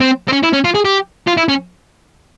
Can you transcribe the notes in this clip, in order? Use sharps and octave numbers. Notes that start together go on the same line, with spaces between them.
C4
C4
C#4
E4
C#4
F4
G#4
G4
F4
E4
C#4